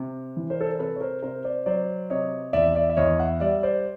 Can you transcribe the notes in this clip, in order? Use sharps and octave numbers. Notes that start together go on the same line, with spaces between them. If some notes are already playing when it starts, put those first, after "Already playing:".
Already playing: C3
E3
A#4 C5
A4
A#4
C3 A4 B4
C#5
A#4 C5
C3 A#4 C5
C5 D5
F#3 C5 D5
C3 C#5 D#5
E2 D5 E5
D5 E5
E5
E2 C#5 D#5
E5 F#5
G3 D5 E5
C5 D5